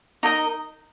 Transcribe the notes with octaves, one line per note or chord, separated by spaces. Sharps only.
D#4 A#4 D#5